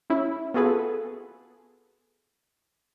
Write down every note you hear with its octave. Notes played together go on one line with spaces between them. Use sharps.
C#4 E4
B3 F4 F#4 G#4 A4 B4